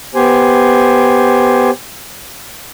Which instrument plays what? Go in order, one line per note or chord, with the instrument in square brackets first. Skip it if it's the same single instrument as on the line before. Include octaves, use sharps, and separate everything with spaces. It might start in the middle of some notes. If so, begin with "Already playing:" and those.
[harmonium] B3 G4 C5 G#5